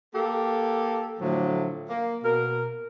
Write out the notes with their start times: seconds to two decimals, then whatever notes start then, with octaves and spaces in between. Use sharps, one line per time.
0.13 A#3 G4 A4
1.20 A2 D3 F3 F#3 A3
1.88 A#3
2.22 B2 A#4